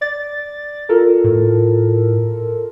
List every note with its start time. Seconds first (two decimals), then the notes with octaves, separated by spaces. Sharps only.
0.01 D5 A6
0.89 F4 A4 A#4
1.24 A2